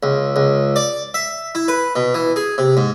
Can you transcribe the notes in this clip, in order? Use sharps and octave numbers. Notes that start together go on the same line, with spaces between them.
C#2
C#2
D5
E5
E4
B4
B2
E3
G#4
C3
G#2